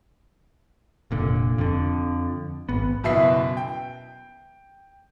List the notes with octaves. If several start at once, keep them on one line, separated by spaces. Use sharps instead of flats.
F1 A#2 D3
F2 D3
G#1 B3
F#1 B2 E4 B4 E5 C7
G5